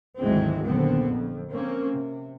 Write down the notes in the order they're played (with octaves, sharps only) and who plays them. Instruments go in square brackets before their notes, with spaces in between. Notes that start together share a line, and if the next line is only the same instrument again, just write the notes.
[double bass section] G#1 D2 E3 F#3 G#3 C4
A#1 D#2 D3 B3 C4
F2
A#3 C4 C#4
C3